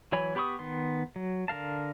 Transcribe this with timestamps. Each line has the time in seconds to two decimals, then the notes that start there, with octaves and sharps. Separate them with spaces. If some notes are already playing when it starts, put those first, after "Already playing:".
0.12 E3 F#3 C#5 G#5 B5
0.35 B3 G4 B5 C#6 D#6
0.59 D#3 B3 C6
1.16 F#3
1.48 D3 A#4 F5 A5